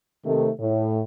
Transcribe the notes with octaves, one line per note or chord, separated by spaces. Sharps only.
C3 D#3 A3
A2